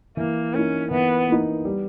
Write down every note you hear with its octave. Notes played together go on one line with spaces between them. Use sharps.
E3 A#3
A#3 C#4 D#4
E3 B3
A#3 D#4
G3